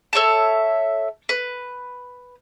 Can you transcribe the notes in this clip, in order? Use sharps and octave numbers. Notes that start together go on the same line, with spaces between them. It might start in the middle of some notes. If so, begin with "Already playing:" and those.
A4 C#5 E5 A5
B4